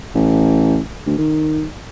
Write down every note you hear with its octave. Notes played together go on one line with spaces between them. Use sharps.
A1
D2
D#3